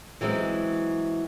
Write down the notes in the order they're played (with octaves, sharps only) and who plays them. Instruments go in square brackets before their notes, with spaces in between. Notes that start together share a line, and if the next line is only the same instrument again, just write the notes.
[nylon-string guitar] E3 F#3 G#3 C4